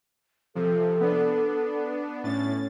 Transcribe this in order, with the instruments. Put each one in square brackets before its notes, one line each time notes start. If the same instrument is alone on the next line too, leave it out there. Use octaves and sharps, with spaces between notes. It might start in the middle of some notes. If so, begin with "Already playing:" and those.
[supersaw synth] C3 F3 [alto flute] A4
[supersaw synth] B3 D4
[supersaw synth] A2 A6 [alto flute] C#4